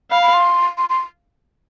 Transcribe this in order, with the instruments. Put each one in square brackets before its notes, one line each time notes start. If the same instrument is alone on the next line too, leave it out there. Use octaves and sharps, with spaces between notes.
[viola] F5 [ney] B5
[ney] B5
C6
C6
C6